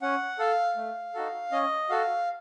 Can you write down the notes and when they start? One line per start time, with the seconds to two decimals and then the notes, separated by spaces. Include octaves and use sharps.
0.02 C#4 F#5
0.39 A4 F5
0.76 A3
1.14 D#4 F#4 A4
1.52 C#4 D#5
1.89 F#4 A4 F5